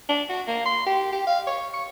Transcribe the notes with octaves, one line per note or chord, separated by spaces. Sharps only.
D4
F#4
A#3
C6
G4
G4
F5
C#5
C#6